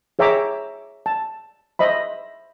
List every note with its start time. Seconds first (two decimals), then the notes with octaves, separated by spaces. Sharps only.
0.19 G#4 C#5 E5 G5 A#5 D6
1.06 A5
1.79 C5 D#5 E5 B5